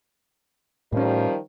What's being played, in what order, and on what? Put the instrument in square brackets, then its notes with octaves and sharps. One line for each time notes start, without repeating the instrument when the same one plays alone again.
[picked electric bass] A2 C#4 [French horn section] D#3 F3 G3